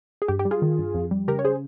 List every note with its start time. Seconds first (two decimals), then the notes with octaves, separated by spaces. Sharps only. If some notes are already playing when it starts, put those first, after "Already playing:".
0.22 G#4
0.28 G2 G4
0.39 G4
0.45 G3
0.51 F4 G#4
0.62 D#3
0.79 G2
0.95 F2
1.11 G3
1.28 C#3 G4 A#4
1.39 C#5
1.45 G#4 C5